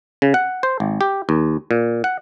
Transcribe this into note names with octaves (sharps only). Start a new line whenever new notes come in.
C#3
F#5
C5
G#1
G4
D#2
A#2
F#5